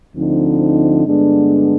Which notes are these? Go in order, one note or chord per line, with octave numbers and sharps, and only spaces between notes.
D2 D3 F3 C4 D#4
G2 D3 G#3 B3 D4